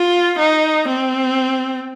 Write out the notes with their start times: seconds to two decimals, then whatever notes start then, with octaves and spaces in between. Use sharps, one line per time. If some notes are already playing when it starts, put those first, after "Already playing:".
Already playing: F4
0.39 D#4
0.88 C4